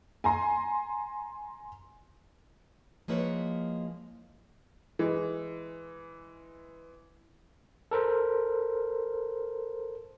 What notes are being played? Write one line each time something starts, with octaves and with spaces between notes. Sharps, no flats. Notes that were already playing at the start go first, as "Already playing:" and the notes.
G#5 A#5 C6
F3 G#3 A#3 E4 B4 C#5
E3 G#3
A4 A#4 C5